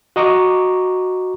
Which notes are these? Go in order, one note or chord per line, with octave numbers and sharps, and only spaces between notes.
F#4 D#5 A#5 C#6 D6